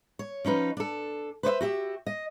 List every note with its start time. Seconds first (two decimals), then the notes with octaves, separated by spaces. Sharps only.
0.19 C#5
0.45 F3 C#4 D#4 B4
0.77 D4 A4
1.43 B4 C5 D5 E5
1.61 F#4 G4 E5
2.06 D#5